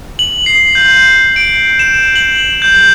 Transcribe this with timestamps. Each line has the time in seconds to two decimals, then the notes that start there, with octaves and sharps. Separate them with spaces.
0.19 F#7
0.46 C7
0.75 G6
1.36 D7
1.79 E7
2.16 F#7
2.62 G6